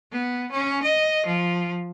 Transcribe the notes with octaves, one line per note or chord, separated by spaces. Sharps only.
B3
C#4
D#5
F3